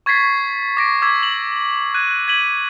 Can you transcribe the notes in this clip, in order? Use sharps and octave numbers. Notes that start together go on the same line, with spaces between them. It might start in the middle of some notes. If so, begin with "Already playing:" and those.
C#6 G#6 A6 B6 C7
D6 A#6 D7
D6 E6 G#6 B6 C7
F#7
F#6 G#6 D#7
G#6 B6 D#7 F#7